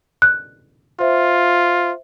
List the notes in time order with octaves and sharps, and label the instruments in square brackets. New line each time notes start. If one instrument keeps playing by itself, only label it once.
[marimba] F#6
[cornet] F4 [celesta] C5 E5